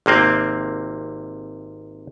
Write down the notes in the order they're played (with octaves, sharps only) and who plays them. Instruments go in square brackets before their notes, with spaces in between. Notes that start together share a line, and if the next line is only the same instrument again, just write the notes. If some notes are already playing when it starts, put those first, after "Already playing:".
[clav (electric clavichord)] G#1 C3 A#3 C4